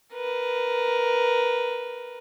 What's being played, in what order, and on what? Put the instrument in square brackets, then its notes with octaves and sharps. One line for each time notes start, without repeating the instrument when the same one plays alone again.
[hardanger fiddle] A#4 B4